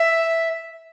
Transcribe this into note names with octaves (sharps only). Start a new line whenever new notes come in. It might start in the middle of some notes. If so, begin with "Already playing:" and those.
Already playing: E5